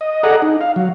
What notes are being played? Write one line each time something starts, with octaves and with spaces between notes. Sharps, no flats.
D#5
G#4 A4 D5 D#5 F#5 A#5
D#4
F5
F#3